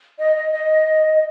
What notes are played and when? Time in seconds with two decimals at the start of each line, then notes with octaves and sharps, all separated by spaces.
0.19 D#5
0.35 D#5
0.52 D#5